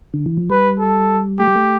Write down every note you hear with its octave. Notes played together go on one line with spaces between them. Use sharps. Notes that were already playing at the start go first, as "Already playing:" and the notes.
D3
E3
F3
G3 B4
A4
A3 G4
G3
A3